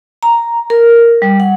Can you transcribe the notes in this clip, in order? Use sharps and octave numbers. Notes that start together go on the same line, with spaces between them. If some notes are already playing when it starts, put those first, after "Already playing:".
A#5
A#4
G3
F#5